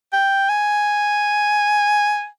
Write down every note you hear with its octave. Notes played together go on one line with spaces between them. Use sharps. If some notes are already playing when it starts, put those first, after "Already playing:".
G5
G#5